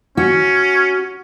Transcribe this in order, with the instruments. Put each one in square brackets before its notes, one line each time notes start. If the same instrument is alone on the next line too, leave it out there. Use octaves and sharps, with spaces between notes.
[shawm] C#4 [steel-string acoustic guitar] F#4